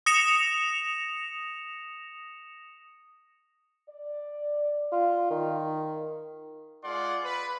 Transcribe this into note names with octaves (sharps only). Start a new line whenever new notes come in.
D#6 A#6 C#7 E7 F7
D5
F4
D#3
G#3 F4 D5 F#5 C6
B4